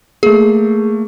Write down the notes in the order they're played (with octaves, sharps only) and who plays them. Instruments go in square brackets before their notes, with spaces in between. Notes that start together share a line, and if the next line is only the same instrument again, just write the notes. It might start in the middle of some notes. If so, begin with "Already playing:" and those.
[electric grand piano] A3 A#3 [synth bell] G#4